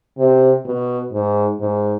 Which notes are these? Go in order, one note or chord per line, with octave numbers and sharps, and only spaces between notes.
C3
B2
G#2
G#2